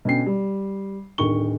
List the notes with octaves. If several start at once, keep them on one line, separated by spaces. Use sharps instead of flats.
B2 D3 C#4 G5 C7
G3
D1 D3 D#3 C#6 G7